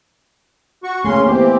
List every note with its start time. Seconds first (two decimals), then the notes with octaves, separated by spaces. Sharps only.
0.84 F#4 C#6
1.05 C#3 A3 A#3 C#4 C6
1.26 E3 B3 C4 G4 C5